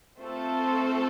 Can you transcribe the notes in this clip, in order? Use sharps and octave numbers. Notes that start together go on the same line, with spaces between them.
A3 C4 F4 A4 C5